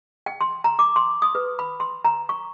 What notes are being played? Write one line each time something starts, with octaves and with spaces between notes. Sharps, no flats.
G5
C6
A#5
D6
C6
D#6
B4
B5
C6
A#5
C#6